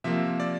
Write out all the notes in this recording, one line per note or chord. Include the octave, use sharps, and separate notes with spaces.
C3 F3 A#3 E5
D5